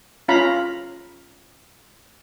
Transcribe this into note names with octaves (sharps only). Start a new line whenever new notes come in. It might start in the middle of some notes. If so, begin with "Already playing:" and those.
C#4 F4 F5 A#5 B5